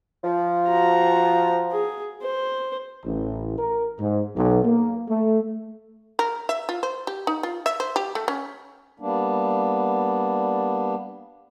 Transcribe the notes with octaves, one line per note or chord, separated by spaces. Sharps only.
F3
F#4 A#5
G#4
C5
A1
A#4
G#2
B1
A#3
A3
A#4
E5
F4
C5
G4
D#4
F4
E5
C5
G4
A3
C#4
G3 A#3 B3 D4